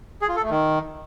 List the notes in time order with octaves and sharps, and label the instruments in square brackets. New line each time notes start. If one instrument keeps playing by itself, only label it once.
[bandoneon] G#4
F4
A4
A3
D#3